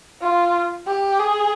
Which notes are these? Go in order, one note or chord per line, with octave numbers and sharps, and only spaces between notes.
F4
G4
G#4